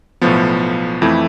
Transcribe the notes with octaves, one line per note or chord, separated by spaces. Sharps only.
B1 A2 F3 B3
F2 E3 A3 E4